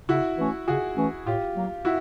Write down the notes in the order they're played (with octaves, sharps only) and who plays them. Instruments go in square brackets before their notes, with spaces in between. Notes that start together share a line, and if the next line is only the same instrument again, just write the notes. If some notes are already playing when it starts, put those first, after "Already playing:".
[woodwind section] C#3 [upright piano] E4 F#4
[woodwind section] E3 A3 C#4
[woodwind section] C#3 [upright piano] F#4 G#4
[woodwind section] E3 A3 C#4
[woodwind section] A2 [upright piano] F4 G4
[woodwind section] F#3 A#3
[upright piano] E4 F#4